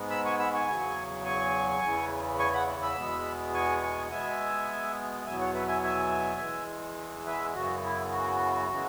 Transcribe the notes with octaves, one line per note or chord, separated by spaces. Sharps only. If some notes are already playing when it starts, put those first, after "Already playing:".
Already playing: G#2 G#3 B3
B5 E6
G#5 C#6
B5 E6
G#5 C#6
E2 C#3 F#3
G#5 C#6
E2 C#3 E3 B3
G#5 C#6
F#5 B5
B5 E6
E2 B2 G#3 B3
G#5 C#6
G#5 C#6
B2 G#3 B3 E5 G#5
E2 B2 F#3 B3 E5 G#5
C#5 F#5
B4 E5
E5 G#5
E5 G#5
E2 E3 G#3
B4 E5
F#2 C#3 E3 B3 F#4
E4
F#4
C#3 E3 G#3